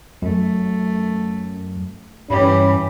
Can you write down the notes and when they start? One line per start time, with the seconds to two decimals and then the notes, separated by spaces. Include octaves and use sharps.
0.22 F#2 A3
2.30 G2 E3 C#4 G4 B5